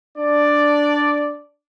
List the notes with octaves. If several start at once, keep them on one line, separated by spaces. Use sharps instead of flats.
D4 D5